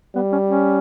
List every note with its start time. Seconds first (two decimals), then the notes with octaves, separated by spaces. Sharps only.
0.15 G3 B3
0.32 C#4
0.49 C#4